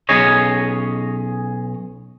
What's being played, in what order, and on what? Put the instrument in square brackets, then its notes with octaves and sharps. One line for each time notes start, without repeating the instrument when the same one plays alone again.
[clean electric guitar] B1 C#4 G#4 C#5 D#5